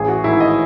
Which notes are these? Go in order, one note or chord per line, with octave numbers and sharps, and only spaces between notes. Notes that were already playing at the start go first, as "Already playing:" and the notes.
Already playing: A1 G#4
F#4
G#2 D#3 E4
D#5